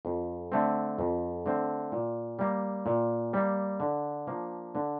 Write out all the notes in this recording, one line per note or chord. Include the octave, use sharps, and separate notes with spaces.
F2
D3 A3 C4
F2
D3 A3 C4
A#2
G3 A#3
A#2
G3 A#3
D3
F3 A#3 D4
D3